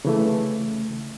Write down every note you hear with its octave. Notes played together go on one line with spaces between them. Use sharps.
C#3 E3 A3